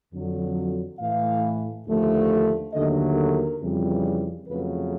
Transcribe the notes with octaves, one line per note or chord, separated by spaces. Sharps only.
F2 D3 F#3
A2 E3 A3 F5
D#2 D3 F3 A3
D#2 D3 F#3 A3 D#5
A#4
F2 C#3 E3 G3
F2 C#3 F#3 A3 B4